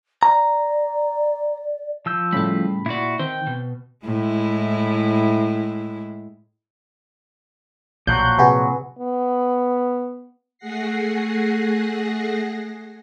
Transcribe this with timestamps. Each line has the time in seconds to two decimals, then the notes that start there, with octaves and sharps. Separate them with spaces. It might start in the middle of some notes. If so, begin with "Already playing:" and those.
0.23 D5 A#5
2.06 F3 E6 G6
2.33 A2 C#3 G3 A5 B5
2.86 A#2 E4 F#4 D5
3.19 D#3 C4 G5
3.47 B2
4.04 A2 G#3 E4
8.07 B1 A#2 F3 F#3 F#6 G6
8.39 C3 F#4 G#4 B4
8.99 B3
10.58 A3 G#4 F#5 A#6 C7